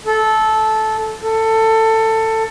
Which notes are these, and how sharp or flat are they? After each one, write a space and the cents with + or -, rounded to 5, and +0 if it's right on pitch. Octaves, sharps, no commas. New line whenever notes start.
A4 -15
A4 +15